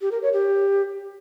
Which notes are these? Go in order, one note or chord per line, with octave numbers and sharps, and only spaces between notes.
G4
A#4
C#5
G4